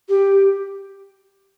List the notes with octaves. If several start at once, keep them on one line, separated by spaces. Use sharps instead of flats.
G4